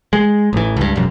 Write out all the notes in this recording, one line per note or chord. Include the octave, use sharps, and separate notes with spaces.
G#3
A1 E3
C#2 G2
E1 F#2